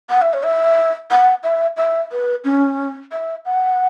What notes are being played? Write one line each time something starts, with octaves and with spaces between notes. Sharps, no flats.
F#5
E5
C#5
E5
F#5
E5
E5
B4
C#4
E5
F#5